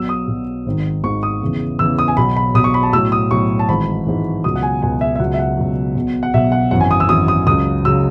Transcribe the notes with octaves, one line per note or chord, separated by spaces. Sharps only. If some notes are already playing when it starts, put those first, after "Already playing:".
Already playing: B1 B2 F#3 E6
D#6
B1 B2 F#3
G#1 G#2 D#3
G#1 G#2 D#3 C#6
D#6
E2 C#3 E3
E2 C#3 E3 E6
D#6
G#5
B1 B2 F#3 B5
B5
B1 B2 F#3 D#6
C#6
B5
A5
B1 A2 F#3 E6
D#6
B1 A2 F#3 C#6
A5
G#1 G#2 E3 B5
G#1 G#2 E3
C#2 B2 F#3 D#6
F#5
G#5
C#2 B2 F#3 G#5
E5
E5
C#2 B2 F#3 F#5
E5
F#5
C#2 B2 F#3
B1 B2 F#3
F#5
B1 B2 F#3 E5
F#5
G#1 F#2 E3 F#5
G#5
D#6
E6
G#1 F#2 E3 D#6
D#6
C#2 C#3 F#3 D#6
C#3 F#3 E6